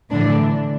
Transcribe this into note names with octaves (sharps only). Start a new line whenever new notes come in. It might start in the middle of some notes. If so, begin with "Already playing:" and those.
A2 D3 E3 D4